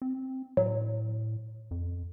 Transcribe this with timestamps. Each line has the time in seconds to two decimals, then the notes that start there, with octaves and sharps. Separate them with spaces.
0.02 C4
0.57 A2 F#3
1.71 F2